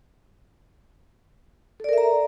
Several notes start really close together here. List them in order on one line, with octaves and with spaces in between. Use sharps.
A4 D5 A#4 E5 A#5